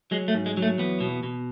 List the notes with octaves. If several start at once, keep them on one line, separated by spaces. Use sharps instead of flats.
F#3 G#3
A3
G#2
G#3
F#3
A3
E2 B3
B2
B2